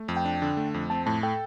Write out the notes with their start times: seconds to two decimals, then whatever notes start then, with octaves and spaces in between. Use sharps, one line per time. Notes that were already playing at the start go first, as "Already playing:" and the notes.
Already playing: A3
0.08 F2
0.17 G5
0.25 D4
0.42 D3
0.57 A3
0.74 F2
0.90 C4 A5
1.06 A2 A5
1.23 A4 G5